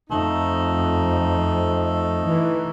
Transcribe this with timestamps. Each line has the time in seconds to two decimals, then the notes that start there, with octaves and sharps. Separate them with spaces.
0.10 F2 A3 D#4
2.28 E3